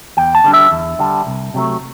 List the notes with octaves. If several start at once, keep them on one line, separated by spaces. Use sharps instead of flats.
E2 G5
A5
D3 G3 D4
E5
E2
D3 G3 D4
C2
C3 F#3 A3